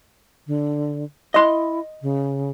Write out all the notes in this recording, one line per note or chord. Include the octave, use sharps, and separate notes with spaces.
D3
E4 D#5 C6
C#3